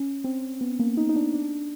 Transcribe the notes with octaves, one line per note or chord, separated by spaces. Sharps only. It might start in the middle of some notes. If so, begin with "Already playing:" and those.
Already playing: C#4
C4
B3
A#3
D#4
D#4
D4
D4